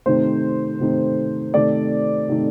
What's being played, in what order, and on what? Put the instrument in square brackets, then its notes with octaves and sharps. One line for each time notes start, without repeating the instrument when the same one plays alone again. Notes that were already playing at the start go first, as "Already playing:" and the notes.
[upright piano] C3 D#3 A3 C5
C3 D#3 A3
C3 D#3 A3 D5
C3 D#3 A3